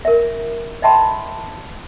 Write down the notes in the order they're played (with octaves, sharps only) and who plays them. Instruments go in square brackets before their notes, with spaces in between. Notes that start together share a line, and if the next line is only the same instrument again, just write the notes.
[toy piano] A#4 E5
D#5 E5 G5 A5 B5 C6